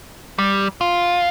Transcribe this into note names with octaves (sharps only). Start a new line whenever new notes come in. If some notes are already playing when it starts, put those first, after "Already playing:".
G3
F4